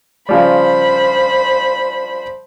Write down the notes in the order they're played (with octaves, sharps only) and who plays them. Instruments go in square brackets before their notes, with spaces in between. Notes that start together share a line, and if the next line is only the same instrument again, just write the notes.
[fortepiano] C#3 F3 G3 [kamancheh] C5 B5